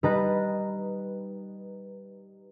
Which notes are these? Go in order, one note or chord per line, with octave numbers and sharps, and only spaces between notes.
G3 D#4 B4 A#5 F#6 A6